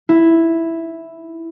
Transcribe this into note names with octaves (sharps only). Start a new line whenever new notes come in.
E4